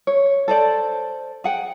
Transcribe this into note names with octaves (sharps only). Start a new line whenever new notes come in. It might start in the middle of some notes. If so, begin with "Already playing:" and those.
C#5
A4 C5 D5
G#4 F#5 G5